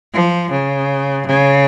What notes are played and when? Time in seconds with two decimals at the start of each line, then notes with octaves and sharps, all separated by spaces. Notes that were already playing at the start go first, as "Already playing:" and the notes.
0.14 F3
0.50 C#3
1.26 C#3